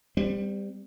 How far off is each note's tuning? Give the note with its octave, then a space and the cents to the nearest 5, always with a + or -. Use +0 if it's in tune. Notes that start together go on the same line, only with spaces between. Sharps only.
G3 +15 C4 -30